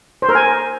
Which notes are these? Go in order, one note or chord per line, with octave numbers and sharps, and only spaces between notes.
C5
A#4
G#5